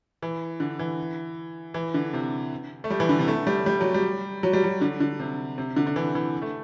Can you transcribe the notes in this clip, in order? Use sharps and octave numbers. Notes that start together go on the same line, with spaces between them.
E3
D3
E3
E3
D3
C3
A3
G3
E3
D3
C3
A3
G3
G3
F#3
G3
F#3
G3
F#3
D3
D3
C3
C3
D3
D3
E3
E3
A3